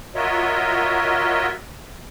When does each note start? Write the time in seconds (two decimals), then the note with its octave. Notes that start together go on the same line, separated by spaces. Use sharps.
0.15 F4 F#4 A#4 C#5 D#5 E5